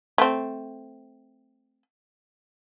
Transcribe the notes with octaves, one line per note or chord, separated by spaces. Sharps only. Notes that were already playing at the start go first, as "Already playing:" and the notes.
A3 C4